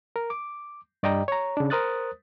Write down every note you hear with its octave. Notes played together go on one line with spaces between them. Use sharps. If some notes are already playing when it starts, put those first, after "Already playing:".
A#4
D6
G2 D5 D#5 G5 A#5
C#5 A#5
C#3 D4
A#4 C5 D#6 F#6 A6